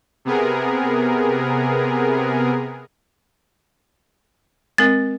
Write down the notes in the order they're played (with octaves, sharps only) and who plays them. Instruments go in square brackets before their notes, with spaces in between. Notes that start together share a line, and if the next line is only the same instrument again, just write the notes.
[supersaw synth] C3 B3 G#4 A#4
[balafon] G#3 C4 A#4 [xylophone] A6